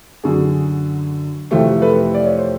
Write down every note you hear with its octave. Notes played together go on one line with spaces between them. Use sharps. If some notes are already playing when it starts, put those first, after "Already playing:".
F#2 D3 F#3 F#4 G#4
F2 C3 E3 A3 C4 G4 A4
A4 B4
D5
C#5
C5